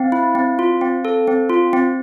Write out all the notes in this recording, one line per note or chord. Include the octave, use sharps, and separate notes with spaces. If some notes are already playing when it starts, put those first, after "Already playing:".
Already playing: C4 F5
E4
C4
F4
C4
A4
C4
F4
C4